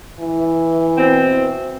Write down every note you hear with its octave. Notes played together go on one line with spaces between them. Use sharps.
E3
B2 C4